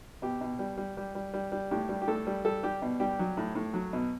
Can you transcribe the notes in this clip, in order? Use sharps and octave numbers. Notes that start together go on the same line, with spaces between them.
B2 G4
B2
G3
G3
G3
G3
G3
G3
A2 G4
G3
G4
A2 A4
G3
G3 A4
G3 G4
B2
G3 G4
F#3
A2
A2
F#3
B2